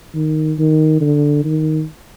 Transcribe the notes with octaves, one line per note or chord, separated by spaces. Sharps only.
D#3
D#3
D3
D#3